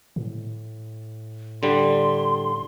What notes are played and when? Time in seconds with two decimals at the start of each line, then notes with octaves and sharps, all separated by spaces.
0.16 A2
1.63 D3 G3 C6